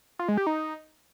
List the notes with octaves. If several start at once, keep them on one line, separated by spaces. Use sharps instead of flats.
F4
G#3
G4
D#4